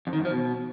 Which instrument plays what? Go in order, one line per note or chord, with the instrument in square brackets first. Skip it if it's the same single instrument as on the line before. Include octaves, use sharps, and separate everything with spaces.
[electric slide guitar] F2
D#3
F#2
F3
B2